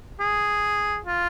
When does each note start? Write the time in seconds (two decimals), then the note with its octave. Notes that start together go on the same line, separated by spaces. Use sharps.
0.20 G#4
1.06 F4